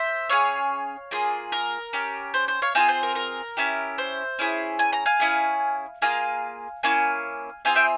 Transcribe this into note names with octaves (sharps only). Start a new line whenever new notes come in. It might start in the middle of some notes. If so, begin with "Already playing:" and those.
Already playing: C5 E5
C#4 E4 G#4 C#5 F5
A#3 F4 G#4
A#4
C#4 G4
C5
C5
C#5 F5
C4 F4 G#4 F5 G#5
C5
A#4
A#4
C#4 E4 G4
C5
C#4 E4 G#4
G#5
A#5
F5 G#5
C#4 E4 G#4
A#3 F4 G#4 F5 G#5
A#3 C#4 E4 F5 G#5
C4 F4 G#4 F5 G#5
E5 G5